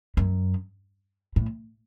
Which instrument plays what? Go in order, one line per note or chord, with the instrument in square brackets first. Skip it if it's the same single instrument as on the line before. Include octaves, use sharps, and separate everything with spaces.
[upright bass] F#2
A2